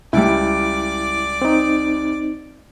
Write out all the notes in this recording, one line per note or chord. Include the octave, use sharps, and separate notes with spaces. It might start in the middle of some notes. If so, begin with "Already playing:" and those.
C#2 G3 E4 D5 D6
C4 D#4